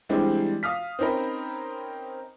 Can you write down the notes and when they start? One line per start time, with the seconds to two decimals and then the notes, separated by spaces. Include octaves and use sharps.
0.09 E3 G3 G#3 C4 D4
0.63 F5 D#6 F6 B6
0.99 C4 C#4 D#4 A#4 B5